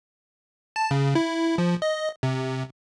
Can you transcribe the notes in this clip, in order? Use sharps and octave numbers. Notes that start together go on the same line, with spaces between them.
A5
C#3
E4
F3
D#5
C3